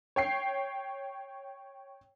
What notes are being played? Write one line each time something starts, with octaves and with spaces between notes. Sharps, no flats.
C#5 G5 C7